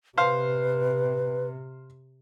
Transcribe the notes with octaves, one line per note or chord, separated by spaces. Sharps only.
C3 B4 C5 F5